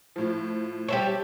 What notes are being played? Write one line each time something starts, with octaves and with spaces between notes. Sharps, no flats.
A2 F3
G3 G4 C5 C#5 E5 A5